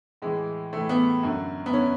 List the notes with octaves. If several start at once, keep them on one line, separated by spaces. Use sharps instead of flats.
A2 E3 G#3
A2 E3 A3
B3
F#2 D3
B3
D3 C#4